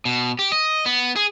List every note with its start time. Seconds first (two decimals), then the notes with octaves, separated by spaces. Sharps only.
0.05 B2
0.39 G4
0.52 D#5
0.86 B3
1.16 G#4